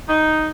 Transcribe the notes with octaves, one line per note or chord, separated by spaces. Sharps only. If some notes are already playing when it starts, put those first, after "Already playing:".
D#4